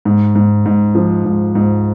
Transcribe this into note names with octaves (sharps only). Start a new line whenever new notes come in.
G#2
G#2
G#2
F3
G#2
G#2